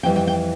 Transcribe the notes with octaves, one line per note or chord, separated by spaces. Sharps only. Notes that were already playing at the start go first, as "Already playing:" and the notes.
F2 E3 G3 G5
G5
G5